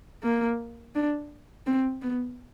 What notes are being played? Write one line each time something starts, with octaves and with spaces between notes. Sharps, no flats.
A#3
D4
C4
B3